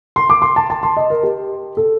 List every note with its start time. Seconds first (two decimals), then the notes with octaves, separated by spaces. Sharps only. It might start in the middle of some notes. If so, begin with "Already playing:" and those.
0.16 C6
0.30 D6
0.42 C6
0.56 A5
0.70 A5
0.83 C6
0.97 D#5
1.10 A#4
1.23 G4
1.77 A4